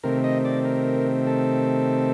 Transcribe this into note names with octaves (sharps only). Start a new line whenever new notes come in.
C3 D#3 A3 C4 A#4
D#5
D5
A#4
A4